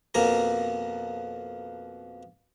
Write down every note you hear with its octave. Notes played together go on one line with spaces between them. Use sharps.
F2 B2 A#3 G#5 A#5